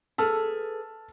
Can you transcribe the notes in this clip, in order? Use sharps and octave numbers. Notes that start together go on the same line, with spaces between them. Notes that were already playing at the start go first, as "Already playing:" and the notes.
G#4 A4 B4 A5 E6 F6